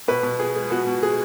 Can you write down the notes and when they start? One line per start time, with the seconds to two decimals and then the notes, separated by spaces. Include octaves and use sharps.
0.08 B2 B4
0.23 B2
0.39 B3 G#4
0.56 G#3
0.70 B3 F#4
0.87 B2
1.03 G#3 G#4